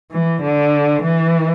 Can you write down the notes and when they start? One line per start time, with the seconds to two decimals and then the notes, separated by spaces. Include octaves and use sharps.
0.12 E3
0.42 D3
1.03 E3